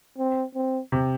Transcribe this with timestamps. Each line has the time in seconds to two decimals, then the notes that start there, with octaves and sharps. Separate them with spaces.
0.18 C4
0.55 C4
0.92 C3